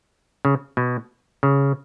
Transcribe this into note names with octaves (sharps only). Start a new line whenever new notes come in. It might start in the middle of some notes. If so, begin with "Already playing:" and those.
C#3
B2
C#3